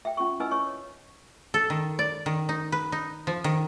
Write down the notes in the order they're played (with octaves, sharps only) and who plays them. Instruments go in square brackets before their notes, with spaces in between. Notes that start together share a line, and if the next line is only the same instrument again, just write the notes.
[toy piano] E5 G5
C#4 F4 C#6
C#4 E4 B4 D#5 G#5 E6
C#5 D#5 C#6
C#5
[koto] A4
D#3
D5
D#3
D#4
B4
D#4
F3
D#3